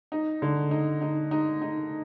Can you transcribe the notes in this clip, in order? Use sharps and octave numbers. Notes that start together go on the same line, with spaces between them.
D#4
D3
D#4
D#4
D#4
D#4